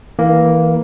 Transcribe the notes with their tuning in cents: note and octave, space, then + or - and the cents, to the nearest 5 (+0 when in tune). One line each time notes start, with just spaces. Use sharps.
E3 -25 A#3 +0